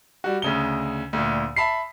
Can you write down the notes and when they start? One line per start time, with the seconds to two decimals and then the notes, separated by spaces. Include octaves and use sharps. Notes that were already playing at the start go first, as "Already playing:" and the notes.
0.24 G3 F#4
0.42 D2 C#3 G7
1.13 D2 A#2
1.56 E5 A5 B5 B6 C7